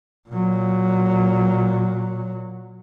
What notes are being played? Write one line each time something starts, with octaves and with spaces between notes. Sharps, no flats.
A#2 F#3